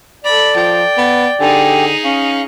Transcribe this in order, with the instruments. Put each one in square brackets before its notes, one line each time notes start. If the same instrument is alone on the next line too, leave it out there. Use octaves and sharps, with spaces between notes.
[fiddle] A4 B5 [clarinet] D5
[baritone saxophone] F3 [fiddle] G5
[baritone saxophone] B3 [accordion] B4
[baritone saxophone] D3 [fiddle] D#4 G#4 [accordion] G4 G5 G#5
[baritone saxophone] C#4 [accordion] F5